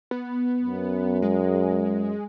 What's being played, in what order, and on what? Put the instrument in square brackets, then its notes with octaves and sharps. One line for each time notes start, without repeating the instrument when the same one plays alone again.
[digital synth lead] B3
[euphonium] F#2
[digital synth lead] G#3